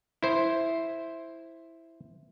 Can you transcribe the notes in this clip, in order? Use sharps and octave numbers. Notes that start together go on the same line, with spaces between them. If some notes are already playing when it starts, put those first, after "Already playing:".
E4 C5